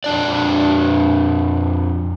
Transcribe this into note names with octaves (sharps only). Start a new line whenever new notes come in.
F2 D4 D5